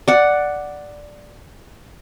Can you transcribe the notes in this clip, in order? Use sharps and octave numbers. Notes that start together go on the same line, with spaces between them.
D5 F#5